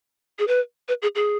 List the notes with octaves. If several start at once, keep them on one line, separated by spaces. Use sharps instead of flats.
G#4
B4
B4
G#4
G#4